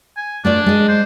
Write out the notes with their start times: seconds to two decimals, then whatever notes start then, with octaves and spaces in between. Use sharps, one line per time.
0.17 G#5
0.45 A3 D4 F4 D5
0.66 G#3 D#5
0.88 C5